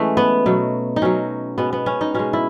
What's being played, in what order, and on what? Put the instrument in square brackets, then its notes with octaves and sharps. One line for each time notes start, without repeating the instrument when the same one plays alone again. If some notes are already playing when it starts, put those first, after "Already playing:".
Already playing: [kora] E3 G#3 A3 C#4
B3
B2 F#3
D#4
B2 F#3 C#4
B2 G#3 B3
B3
C#4
D#4
B2 G#3 C#4
E4